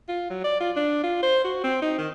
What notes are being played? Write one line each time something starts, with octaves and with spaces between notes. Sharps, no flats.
F4
F#3
D5
F4
D4
F4
C5
F#4
C4
D#4
D#3